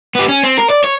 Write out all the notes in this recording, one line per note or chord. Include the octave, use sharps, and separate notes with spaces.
B3 G4
C#4
C4
A#4
D5
C#5